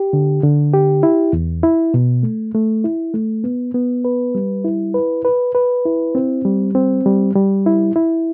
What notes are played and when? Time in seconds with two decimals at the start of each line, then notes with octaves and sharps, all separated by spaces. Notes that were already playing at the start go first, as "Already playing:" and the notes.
Already playing: G4
0.13 D3
0.43 D3
0.74 G4
1.03 E4
1.33 E2
1.63 E4
1.94 B2
2.23 A3
2.54 A3
2.84 E4
3.14 A3
3.44 B3
3.74 B3
4.05 B4
4.35 G3
4.64 E4
4.94 B4
5.25 B4
5.55 B4
5.86 E4
6.15 C4
6.45 G3
6.75 C4
7.06 G3
7.36 G3
7.66 E4
7.96 E4